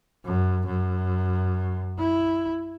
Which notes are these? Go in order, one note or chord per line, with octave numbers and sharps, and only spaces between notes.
F#2
F#2
E4